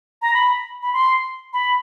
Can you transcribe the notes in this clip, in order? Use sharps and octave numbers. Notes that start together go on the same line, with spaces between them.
A#5
B5
B5
C6
B5